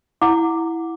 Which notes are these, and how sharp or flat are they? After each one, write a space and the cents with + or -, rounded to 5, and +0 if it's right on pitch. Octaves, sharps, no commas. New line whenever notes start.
E4 +0 F#5 -15 D6 +0